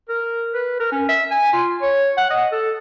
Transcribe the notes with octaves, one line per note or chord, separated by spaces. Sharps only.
A#4
B4
A#4
C#4
E5
G#5
F4
C#5
F#5
D#5
A4